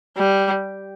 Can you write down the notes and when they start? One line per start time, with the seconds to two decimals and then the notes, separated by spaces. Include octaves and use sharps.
0.17 G3